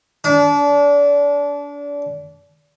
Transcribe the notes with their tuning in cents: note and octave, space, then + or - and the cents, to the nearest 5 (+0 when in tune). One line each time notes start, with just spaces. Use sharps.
D4 -30